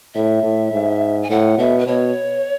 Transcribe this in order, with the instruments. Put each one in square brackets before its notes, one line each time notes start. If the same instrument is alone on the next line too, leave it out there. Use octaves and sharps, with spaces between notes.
[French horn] A2 [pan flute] E5
[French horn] A2
G#2
[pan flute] G#5
[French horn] A2 [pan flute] F#5
[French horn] B2 [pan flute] E5
[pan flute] B4
[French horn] B2 [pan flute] C#5